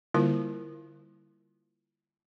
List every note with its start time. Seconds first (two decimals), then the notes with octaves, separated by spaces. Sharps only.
0.14 D3 G3 A#3 E4 F4 A#4